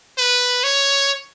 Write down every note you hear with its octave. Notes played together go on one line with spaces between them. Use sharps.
B4
C#5